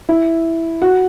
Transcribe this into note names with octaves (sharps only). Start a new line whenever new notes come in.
E4
F#4